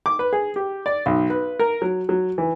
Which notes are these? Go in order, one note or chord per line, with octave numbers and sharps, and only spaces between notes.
D6
B4
G#4
G4
D5
B1
B4
A#4
F#3
F#3
E3